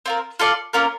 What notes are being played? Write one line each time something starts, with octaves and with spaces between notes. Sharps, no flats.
C4 F4 A#4
F4 A4 D5 F5
A#3 C#4 F4 A#4